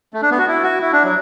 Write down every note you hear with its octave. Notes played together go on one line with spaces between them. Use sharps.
A3
D4
B3
F#4
E4
F#4
E4
D4
F#3